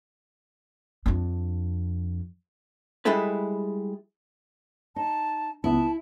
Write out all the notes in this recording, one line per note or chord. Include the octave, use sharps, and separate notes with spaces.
F2 D4
G3 G#3 E4 G#4 A4 B4
D#4 A5
C#2 B3 E4 A5